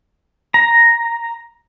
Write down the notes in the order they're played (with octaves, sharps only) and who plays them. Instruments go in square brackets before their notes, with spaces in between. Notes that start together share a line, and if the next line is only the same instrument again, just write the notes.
[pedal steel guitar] A#5